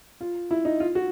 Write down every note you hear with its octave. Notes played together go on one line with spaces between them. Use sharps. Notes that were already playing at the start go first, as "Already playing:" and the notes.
F4
E4
D#4
F4
F#4